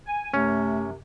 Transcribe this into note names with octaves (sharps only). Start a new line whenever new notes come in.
G#5
F#2 C3 A3 C#4